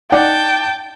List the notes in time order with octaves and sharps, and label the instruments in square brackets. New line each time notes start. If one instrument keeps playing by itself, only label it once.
[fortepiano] D#4 D5 F#5 [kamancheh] G5 A5